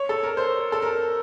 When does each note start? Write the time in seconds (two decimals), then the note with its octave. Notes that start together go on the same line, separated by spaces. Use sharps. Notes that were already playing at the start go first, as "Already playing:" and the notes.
Already playing: C#5
0.09 A4
0.23 A#4
0.37 C5
0.72 A4
0.82 A#4